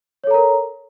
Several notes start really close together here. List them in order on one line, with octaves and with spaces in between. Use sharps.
C#5 A4 A#5 A#4